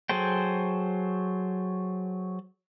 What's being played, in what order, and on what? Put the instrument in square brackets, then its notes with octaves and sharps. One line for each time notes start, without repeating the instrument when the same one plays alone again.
[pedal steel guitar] F#3 G#4 A4 C5 G5